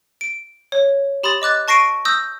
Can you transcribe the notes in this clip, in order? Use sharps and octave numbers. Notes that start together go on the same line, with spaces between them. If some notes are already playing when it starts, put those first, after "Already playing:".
D7
C#5
G4 B5 C6 D#6 A6
D#5 D6 F#6 A6
A5 C#6 A#6 C7 D7 D#7
D#6 E6 G6 A#6